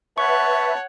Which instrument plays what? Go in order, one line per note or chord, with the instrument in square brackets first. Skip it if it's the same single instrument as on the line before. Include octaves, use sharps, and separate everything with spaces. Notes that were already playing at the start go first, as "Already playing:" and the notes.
[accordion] B4 E5 [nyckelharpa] C#5 F#5 [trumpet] A5 [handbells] C#6